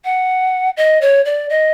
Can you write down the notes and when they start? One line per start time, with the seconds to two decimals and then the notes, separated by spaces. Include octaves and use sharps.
0.05 F#5
0.77 D#5
1.01 C#5
1.25 D5
1.50 D#5